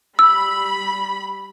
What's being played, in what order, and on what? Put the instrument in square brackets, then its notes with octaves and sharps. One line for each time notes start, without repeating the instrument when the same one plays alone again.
[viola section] G3 B5 [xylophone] E6